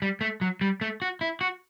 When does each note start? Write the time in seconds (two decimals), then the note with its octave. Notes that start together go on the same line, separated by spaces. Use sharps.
0.02 G3
0.21 A3
0.41 F#3
0.61 G3
0.81 A3
1.02 F#4
1.21 E4
1.41 F#4